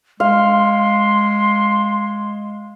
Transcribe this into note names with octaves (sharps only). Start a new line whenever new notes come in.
G#3 F5 C6